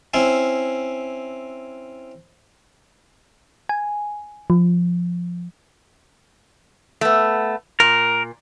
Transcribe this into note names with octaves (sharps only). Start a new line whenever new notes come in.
C4 C#4 E4
G#5
F3
A3 B3
A#2 A#4